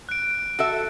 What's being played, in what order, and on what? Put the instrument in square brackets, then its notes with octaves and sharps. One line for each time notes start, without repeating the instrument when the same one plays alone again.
[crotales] F#6 D7
[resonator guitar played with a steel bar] F#4 A4 E5